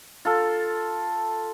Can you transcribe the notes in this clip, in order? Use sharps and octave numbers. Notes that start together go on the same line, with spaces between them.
F4 A4